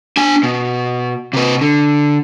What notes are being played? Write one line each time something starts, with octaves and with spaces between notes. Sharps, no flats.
D4 G#5
B2
C3 B4
D3